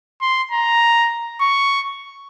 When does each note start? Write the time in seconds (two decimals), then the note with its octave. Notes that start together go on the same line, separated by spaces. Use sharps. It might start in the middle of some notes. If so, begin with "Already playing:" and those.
0.22 C6
0.51 A#5
1.41 C#6